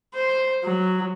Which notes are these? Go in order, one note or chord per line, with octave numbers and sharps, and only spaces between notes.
C5
F#3